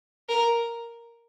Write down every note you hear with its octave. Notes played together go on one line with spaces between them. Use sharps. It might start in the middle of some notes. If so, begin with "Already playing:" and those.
A#4